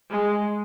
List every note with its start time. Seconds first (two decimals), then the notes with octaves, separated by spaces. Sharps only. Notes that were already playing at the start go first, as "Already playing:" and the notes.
0.10 G#3